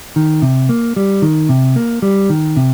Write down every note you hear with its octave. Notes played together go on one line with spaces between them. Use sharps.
D#3
C3
A#3
G3
D#3
C3
A#3
G3
D#3
C3